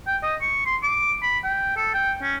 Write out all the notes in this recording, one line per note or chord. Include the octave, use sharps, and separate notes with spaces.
G5
D#5
C#6
C6
D6
B5
G5
A4
G5
C#4